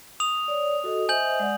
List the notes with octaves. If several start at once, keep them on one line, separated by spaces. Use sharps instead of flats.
D#6 F7
C#5 D5
F#4 A4 D#5
C5 D#5 E5 G#5 G6 F#7
G#3 D5 F#5